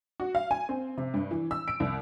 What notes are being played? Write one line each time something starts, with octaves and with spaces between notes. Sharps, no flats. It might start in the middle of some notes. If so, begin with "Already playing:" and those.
F#4
F5
G#5
C4
C3
G2
E3
E6
D7
C2